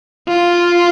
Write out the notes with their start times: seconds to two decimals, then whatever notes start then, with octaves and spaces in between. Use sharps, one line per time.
0.28 F4